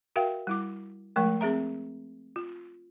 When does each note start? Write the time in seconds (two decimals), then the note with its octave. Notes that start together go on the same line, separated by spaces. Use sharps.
0.16 F#4 A#4 E5 F5 G5
0.47 G3 E4 D6
1.16 F3 G#3 A3 A#4
1.41 C4 G#4 E5 A#5
2.36 F4